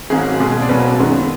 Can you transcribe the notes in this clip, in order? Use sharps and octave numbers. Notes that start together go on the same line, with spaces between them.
G#1 G#2 F#3 A#3 G#4
B1 B2 G#3
D5
B1 B2 F#3 A#3 B4
F#2 D#3 G#3 B3